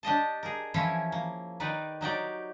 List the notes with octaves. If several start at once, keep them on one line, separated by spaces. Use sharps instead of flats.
D4 G4 D#5 A5
G#4 A#4
E3 F3 C#4 E4 C#5
A#3
D#3 D#4 B4 D5
F#3 D#4 G4 D5